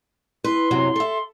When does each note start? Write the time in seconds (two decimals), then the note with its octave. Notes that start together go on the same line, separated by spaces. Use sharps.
0.44 E4 B4 C6
0.71 F#2 C3 F#3
0.96 A4 E5